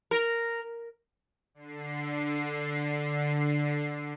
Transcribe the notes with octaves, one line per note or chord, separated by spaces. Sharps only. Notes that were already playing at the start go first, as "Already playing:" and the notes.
A#4
D3 C7